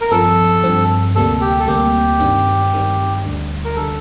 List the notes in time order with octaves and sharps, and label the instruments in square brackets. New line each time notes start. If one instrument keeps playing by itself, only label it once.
[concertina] A#4
[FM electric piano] G2 F3 C4 [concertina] A4
[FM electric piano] G2 F3 C4
[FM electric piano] D2 C3 G3 A#3 [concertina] A4
[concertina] G4
A4
[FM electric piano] D2 C3 G3 A#3 [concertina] G4
[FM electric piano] G2 D#3 G3 C4
G2 D#3 G3 C4
D2 D3 G3
[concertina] A#4
[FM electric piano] D3 G3 [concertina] A4